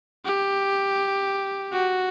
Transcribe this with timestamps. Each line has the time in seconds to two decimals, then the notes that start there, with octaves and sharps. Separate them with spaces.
0.25 G4
1.73 F#4